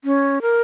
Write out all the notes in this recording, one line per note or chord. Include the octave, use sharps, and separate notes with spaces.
C#4
A#4